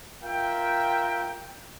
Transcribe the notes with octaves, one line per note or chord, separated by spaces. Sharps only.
F4 A#4 E5 G5